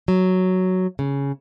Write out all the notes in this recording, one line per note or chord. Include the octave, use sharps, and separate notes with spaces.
F#3
C#3